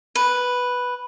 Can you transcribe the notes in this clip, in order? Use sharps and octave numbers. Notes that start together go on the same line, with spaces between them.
B4